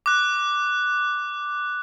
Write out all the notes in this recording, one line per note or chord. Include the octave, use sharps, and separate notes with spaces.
D6 F#6